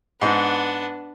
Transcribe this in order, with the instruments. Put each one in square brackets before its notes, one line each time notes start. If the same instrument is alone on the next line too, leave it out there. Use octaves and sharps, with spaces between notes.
[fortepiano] G#2 [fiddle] B3 D4